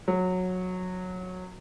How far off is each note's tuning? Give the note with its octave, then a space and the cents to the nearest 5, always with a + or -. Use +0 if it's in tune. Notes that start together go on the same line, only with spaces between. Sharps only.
F#3 -15